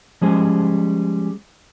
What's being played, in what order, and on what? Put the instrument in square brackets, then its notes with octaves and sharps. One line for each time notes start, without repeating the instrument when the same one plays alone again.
[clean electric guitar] F3 G3 G#3 C#4 G#4 C5